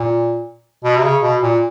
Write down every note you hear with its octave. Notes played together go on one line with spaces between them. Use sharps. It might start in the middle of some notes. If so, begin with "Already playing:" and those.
Already playing: A#2
B2
C3
C#3
B2
A#2